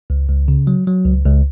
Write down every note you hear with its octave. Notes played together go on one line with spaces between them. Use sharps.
C#2
C#2
C#3
F#3
F#3
C#2
C#2